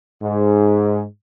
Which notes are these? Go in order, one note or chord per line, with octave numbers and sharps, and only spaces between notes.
G#2